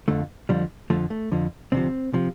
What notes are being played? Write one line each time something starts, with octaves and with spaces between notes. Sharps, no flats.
F2 D3 F3 A3
F2 D3 F3 G3
F2 D3 F3 A3
A3
F2 D3 F3
D2 C3 F3 C4
C3 F3